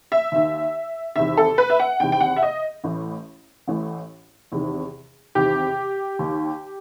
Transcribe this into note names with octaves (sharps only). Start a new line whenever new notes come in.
E5
D#2 D#3
E2 C3 D#3 E5
A4
B4
E5
F#5
E2 C3 D#3 G5
G5
F#5
E5
D#5
A1 A2 E3
A1 A2 E3
E2 C3 D#3
E2 C3 D#3 G4
D#2 D#3